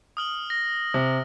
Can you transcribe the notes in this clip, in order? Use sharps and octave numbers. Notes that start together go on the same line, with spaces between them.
D#6 F6 F#7
A#6
C3